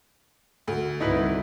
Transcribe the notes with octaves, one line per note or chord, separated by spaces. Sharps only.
D2
C2 G2 D#4 E4 B4